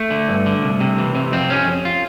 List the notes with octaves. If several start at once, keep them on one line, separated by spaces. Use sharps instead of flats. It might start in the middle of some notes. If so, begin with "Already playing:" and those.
Already playing: A3
D3
G2
D3
C2
C3
E3
C3
F2 C4
F2 C#4
F2
F4